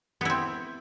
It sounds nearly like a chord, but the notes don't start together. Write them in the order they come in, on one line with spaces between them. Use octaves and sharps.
B3 E4 C4